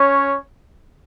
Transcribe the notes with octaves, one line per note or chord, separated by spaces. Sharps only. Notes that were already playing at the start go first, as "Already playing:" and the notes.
Already playing: C#4 C#5